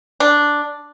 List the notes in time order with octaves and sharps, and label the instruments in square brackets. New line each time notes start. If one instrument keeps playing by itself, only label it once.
[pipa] D4